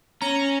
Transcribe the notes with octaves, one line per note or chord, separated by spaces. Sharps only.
C#4 A#5